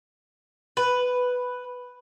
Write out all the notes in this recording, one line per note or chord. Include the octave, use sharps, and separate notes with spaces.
B4